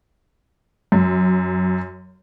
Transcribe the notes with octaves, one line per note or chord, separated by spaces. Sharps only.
F#2